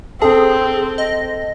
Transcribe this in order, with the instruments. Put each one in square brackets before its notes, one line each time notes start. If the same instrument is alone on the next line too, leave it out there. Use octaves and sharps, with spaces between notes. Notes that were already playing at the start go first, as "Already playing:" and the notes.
[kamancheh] C4 [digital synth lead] G#4 [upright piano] A4
[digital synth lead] D#5